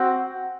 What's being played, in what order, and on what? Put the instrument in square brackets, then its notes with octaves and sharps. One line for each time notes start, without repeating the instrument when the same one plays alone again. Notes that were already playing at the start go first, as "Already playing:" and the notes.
Already playing: [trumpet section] C4 F#4